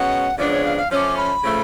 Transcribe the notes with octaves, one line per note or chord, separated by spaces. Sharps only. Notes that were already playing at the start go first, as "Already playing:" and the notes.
Already playing: B2 G#3 C#4 F#5
C#3 F3 G#3 B3 D4 D5
C#5
F5
F5
F3 A3 C#4 D6 F6
B5
C#3 F3 A3